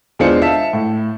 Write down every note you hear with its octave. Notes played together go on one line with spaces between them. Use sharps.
E2 G#3 D4 F4 C5 C#7
E5 F5 A5
A2